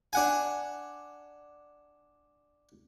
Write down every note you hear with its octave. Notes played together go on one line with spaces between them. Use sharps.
D4 F#5 G#5